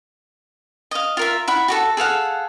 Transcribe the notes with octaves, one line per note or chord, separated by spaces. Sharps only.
D#5 F5
F4 A#4 E5
E4 F#5 B5
F#4 G4 A4
G#4 A4 F5 F#5